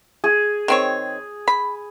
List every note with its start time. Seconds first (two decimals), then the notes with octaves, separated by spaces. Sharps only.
0.24 G#4
0.68 D#3 C4 C#5
1.48 B5